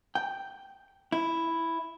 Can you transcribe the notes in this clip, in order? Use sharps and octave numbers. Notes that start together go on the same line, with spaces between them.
G5
E4